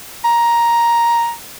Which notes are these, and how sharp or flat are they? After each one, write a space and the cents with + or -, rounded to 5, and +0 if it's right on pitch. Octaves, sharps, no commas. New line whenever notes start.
A#5 +10